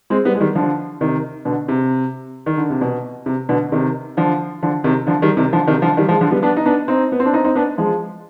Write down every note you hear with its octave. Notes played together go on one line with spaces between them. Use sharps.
G#3 C4
G3 B3
G#3
D#3 G3
D3 F3
C3 D#3
B2 D3
C3
D#3
D3
C3
B2
C3
B2 D3
C3 D#3
D3 F3
D3 F3
C3 D#3
D3 F3
D#3 G3
C3 D#3
D3 F3
C3 D#3
D3 F3
D#3 G3
F3 G#3
D3 F3
G3 B3
B3 D4
D#4
B3 D4
C4 D#4
B3
C4
D4
C4 D#4
C4 D#4
B3 D4
F3 G#3